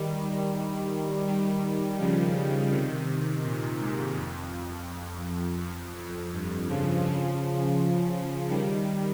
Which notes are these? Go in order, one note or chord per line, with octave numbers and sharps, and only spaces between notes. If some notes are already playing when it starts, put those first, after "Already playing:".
Already playing: D#3 G3
D#3 G3
C#3 F3
C3 D#3
A#2
G#2
F2
F2
F2
G2
C#3 F3
C#3 F3
D#3 G3